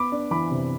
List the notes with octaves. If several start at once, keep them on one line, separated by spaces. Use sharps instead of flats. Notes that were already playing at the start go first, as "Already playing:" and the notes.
Already playing: B3 B5 D6
D4
E3 B5 D6
C3